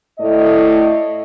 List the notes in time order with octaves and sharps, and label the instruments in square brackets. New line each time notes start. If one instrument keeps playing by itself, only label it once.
[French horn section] A2 A3 D5 D#5